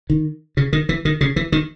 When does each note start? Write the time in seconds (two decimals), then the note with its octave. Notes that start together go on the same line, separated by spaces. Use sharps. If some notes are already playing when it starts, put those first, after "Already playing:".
0.10 D#3
0.57 C#3
0.73 D#3
0.89 E3
1.05 D#3
1.21 C#3
1.36 E3
1.52 D#3